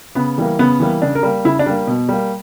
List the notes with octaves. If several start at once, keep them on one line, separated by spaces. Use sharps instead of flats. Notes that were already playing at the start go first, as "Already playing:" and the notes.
C#3 B3
E3 G3 A#3
C#3 B3
E3 G3 A#3
C#3 D4
A#4
G3 A#3
C#3 E4
D4
G3 A#3
B2
G3 A#3